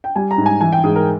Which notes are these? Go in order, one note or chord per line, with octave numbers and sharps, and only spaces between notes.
G5
G3 G#5
A#5
G#2
G#5
E3 G#5
G5
G#2 G#4
A#4